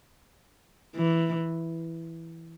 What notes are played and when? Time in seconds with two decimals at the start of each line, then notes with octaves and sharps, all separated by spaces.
0.96 E3